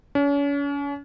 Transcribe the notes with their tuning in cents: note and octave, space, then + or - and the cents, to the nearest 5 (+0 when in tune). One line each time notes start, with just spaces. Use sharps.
C#4 +40